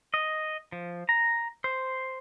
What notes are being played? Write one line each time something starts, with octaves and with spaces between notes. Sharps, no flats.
D#5
F3
A#5
C5